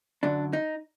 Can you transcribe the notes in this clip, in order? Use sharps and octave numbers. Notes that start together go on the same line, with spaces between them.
F#2 D3 F#3 D4
D#4